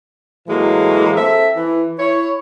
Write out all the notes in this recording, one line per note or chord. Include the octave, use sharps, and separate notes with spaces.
A2 E3 F#3 G#3 A#3
C4 A4 E5
E3
E4 C#5